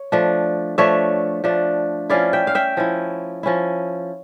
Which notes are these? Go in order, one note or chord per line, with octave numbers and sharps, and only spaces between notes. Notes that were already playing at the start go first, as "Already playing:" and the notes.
Already playing: C#5
F3 A3 D4
F3 A3 D4 C#5 E5
F3 A3 D4
F3 C#4 E4 D5 F5
E5 G5
F5
E5 G5
F3 C#4 E4
F3 C#4 E4